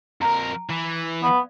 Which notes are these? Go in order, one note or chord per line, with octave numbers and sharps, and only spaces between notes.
F2 A#4 A#5
E3
B3 D5 F5